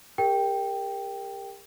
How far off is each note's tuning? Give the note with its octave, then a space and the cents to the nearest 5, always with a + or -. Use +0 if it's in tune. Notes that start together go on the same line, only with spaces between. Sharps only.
G4 +40 A#4 +0 G5 +0